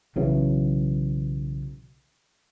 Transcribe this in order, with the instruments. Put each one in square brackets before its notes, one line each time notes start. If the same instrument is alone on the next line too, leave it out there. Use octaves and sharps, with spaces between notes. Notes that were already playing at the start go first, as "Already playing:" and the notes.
[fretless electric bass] B1 C#3 E3 F#3